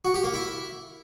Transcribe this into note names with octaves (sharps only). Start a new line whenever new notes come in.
F#4
G4
A#3
E4